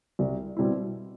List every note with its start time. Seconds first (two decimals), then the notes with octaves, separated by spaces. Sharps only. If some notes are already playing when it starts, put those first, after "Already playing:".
0.19 C2
0.57 B2 G3 C4 E4